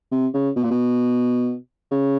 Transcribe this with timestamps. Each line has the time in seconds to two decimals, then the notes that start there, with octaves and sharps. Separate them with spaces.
0.11 C3
0.34 C#3
0.56 B2
0.64 A#2
0.71 B2
1.91 C#3